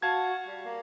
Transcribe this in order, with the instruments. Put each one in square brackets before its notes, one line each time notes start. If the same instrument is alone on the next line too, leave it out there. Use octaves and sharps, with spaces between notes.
[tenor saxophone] F#4 [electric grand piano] F5 A5 G#6
[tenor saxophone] G3
A#3